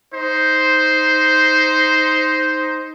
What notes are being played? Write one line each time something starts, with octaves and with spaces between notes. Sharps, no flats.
D#4 C5